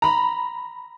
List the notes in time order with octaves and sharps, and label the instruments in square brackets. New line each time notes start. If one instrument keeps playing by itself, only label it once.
[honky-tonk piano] A#5 B5